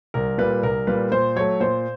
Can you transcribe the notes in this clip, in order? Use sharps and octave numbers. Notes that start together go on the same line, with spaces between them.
C2 A#4
A#2 G3 A#3 B4
C2 A#4
A#2 G3 A#3 B4
A#2 C5
F#3 A3 C#5
A#2 C5